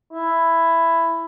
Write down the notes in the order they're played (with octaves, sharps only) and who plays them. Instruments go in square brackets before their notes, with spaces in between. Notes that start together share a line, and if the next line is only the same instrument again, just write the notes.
[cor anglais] E4